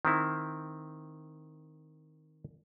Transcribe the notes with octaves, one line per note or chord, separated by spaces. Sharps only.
D#3 C4 E4